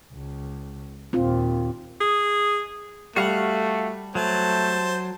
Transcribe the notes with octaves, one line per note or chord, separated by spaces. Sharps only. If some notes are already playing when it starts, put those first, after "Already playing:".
C#2
D#2 A#2 C4 F4
G#4
G3 A3 F#4 F5 F#5
F#3 A3 C5 A5